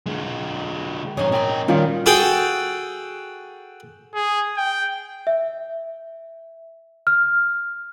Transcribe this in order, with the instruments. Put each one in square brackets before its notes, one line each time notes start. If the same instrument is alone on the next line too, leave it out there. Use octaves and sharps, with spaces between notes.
[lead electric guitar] D3 G#3
[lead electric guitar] F2 G#2 [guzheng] D#4 G#4 [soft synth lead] C#5
[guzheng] A#2 C6 [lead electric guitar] C#4 G5
[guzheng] D#3 [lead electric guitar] G3 [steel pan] C#4 F4 [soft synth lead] F5
[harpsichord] F#4 G#4 A4 G5
[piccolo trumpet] G#4
G5
[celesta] E5
F6